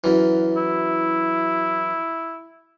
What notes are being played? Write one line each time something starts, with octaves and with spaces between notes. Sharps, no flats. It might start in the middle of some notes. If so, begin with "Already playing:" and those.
F#2 E3
E4